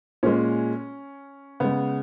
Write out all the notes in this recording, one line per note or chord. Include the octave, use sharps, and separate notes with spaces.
A#2 G#3 C#4
C#3 G#3 B3